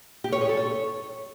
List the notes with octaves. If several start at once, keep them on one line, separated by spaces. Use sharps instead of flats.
G4
C#5
G#4
A4
C#5